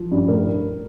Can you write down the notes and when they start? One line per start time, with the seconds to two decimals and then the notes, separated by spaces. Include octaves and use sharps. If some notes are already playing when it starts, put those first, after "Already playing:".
Already playing: F3
0.12 G2
0.28 A2 A#4